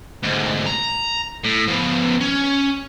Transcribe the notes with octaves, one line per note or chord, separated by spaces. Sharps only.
D2 G#2
A#5
A2
F3 B3
C#4